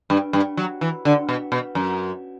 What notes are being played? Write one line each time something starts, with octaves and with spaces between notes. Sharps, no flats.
G2
G2
F#3
E3
D3
B2
B2
F#2